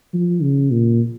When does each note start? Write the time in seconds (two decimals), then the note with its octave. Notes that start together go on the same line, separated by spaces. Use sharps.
0.14 F3
0.42 C#3
0.71 A#2